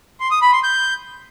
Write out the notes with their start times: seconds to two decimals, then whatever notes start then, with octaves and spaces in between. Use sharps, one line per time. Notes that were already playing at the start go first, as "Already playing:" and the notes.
0.20 C6
0.31 D#6
0.42 B5
0.53 C6
0.63 G6